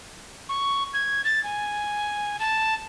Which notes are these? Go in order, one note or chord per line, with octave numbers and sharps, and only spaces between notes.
C#6
G#6
A6
G#5
A5